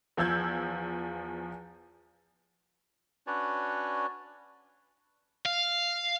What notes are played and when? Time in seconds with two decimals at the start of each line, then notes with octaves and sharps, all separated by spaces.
0.17 E2 F3 E6 G6 G#6
3.27 C#4 D4 F#4 B4 C#5 D5
5.45 F5